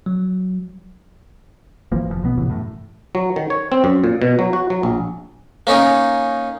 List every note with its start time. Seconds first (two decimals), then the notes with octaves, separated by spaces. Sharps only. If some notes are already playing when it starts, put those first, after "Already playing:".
0.06 F#3
1.92 G#1 E3 F3 A#3
2.08 F1 G#2 F3
2.22 B1 B2 F#3 B3
2.37 F#1 A2 C3 E3
2.50 F#2 A2
3.15 F#3
3.36 D#3
3.50 C#5
3.72 C4
3.84 F#2
4.04 A#2
4.22 B2
4.39 F#3
4.53 F#4
4.70 F#3
4.83 A#1
5.67 A#3 C#4 D#4